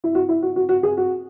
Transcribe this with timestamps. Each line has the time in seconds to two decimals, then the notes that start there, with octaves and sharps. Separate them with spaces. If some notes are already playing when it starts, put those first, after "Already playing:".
0.04 E4
0.15 F#4
0.29 E4
0.42 F#4
0.56 F#4
0.69 F#4
0.83 G#4
0.97 F#4